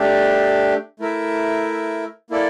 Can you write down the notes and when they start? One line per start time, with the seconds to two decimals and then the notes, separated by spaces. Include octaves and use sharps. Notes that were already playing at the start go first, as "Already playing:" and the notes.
Already playing: A3 D4 G4
1.00 A3 E4 A#4 E5
2.30 A#3 E4 A4 D5